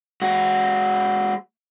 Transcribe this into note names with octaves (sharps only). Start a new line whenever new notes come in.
G#3 F#4